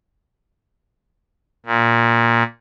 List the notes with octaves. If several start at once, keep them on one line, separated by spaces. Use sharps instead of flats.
A#2